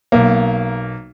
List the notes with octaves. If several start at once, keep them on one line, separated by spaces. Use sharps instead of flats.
B1 A#3